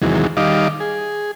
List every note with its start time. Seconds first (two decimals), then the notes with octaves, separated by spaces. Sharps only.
0.02 E2 C3 D#3 E3 F#3 G#3
0.37 D#3 G3 D#5 F5 D6
0.80 G#4